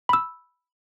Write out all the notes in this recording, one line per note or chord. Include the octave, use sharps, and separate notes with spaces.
B5 E6